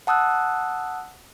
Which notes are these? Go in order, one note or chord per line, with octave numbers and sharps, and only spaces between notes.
F#5 A5 D#6 E6 F#6